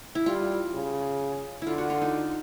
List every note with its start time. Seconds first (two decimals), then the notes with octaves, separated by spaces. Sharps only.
0.15 E4
0.26 G3 F4
0.73 C#3
1.62 D3 E4 F4
1.78 F#4
1.90 F4
2.02 D#4